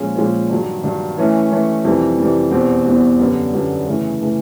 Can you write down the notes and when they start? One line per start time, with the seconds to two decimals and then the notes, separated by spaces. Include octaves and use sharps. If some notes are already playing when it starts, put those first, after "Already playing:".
Already playing: A#2 F3 G#3 C#4
0.16 A#2 F3 G#3 C#4
0.50 G2 D#3 F#3
0.84 G2 D#3 F#3
1.18 E3 A3 C#4
1.50 E3 A3 C#4
1.85 F2 C3 E3 G3
2.18 F2 C3 E3 G3
2.51 E2 B2 G3 C4
2.85 E2 B2 G3 C4
3.19 F#2 D3 G3 B3
3.53 F#2 D3 G3 B3
3.87 C#3 E3 A3
4.21 C#3 E3 A3